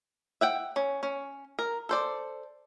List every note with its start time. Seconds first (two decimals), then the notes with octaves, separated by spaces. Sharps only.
0.41 E5 F#5 G5
0.76 C#4
1.03 C#4
1.59 A#4
1.89 A4 C5 D5